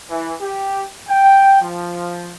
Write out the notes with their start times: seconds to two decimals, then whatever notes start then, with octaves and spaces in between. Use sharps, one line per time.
0.10 E3
0.41 G4
1.09 G5
1.62 F3